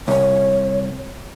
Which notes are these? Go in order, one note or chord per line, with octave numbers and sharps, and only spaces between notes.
C2 C#5